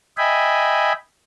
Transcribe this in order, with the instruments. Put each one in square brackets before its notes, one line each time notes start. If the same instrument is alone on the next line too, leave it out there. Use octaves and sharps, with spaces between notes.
[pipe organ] D#5 E5 G5 G#5 B5